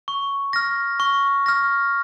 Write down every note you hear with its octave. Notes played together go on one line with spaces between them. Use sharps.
C#6
F6 A#6
C#6
F6 A#6